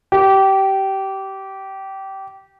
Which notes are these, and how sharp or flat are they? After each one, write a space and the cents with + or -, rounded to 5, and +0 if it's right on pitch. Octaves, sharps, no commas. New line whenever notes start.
G4 -20